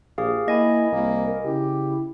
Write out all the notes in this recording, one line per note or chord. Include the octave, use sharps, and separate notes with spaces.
A#1 G4 G#4 F5
A#3 E4 D#5 G#5 B5
C2 A#3 A#4
C#3 E4 G4